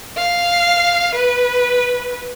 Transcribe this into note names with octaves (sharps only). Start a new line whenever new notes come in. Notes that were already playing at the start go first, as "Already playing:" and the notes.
F5
B4